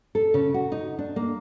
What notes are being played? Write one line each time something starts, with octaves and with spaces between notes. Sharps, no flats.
A4
C#3
F#4
D#4
D4
A#3